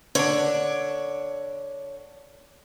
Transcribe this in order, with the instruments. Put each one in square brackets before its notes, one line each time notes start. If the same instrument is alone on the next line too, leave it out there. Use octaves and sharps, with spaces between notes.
[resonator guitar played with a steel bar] D3 D4 [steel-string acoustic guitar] C#5